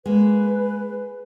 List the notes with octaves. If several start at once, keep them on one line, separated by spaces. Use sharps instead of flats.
G#3 A#3 B4